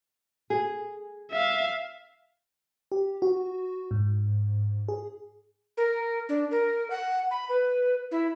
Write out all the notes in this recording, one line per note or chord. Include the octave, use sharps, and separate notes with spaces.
G#4
E5 F5
G4
F#4
G#2
G#4
A#4
D4
A#4
F#5
B5
B4
E4